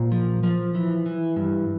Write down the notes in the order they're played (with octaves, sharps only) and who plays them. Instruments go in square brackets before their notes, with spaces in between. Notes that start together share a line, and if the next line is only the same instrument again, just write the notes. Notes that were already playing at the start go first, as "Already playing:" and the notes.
Already playing: [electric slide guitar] A#2 A#4 C5
F3
F3
E3
E3
G2